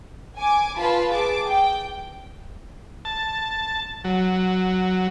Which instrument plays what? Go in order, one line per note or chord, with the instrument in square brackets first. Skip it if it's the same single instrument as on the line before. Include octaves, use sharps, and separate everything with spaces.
[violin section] G#5 D6
F4 B4 A5 B5
G#4 A5 D6
G5
[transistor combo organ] A5
F#3